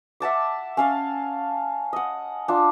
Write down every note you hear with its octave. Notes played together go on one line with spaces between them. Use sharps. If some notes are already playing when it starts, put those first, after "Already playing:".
E5 F#5 A5 D6
C#4 F5 A5
D#5 F#5
D4 F4